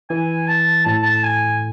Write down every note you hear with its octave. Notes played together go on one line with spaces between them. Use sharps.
E3 G#5
A5
A2 A5
A5
G#5